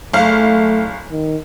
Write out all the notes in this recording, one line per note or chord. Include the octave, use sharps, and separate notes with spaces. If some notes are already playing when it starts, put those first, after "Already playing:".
F#1 A3 F5
D#3